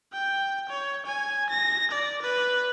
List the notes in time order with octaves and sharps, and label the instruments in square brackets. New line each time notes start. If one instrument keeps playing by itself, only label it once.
[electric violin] G5
C#5
G#5
A#6
D5
B4